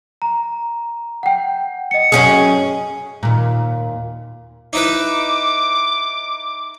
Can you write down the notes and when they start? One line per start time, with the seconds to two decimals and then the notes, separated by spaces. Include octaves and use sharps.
0.22 A#5
1.23 F#5 G5
1.91 D#5 C#7
2.12 F#2 C#4 G#4
3.23 D#2 A#2
4.73 D#4 E4 B4 D6